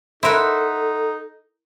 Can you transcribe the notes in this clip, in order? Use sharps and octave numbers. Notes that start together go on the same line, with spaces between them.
D#4 E4 A4 A#4 C5 E5 F#5